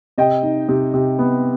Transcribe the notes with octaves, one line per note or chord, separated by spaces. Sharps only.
C3 D#5 G5
D#4
C3
C3
B3